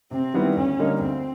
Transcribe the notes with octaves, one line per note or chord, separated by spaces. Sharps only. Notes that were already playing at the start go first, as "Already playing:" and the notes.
C3 C4
D#3 G3 B3 E4
D2 C#4
D3 G3 A#3 D#4
D2 C4